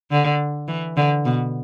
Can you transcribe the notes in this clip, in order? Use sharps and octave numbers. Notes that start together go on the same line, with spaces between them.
D3
E3
D3
B2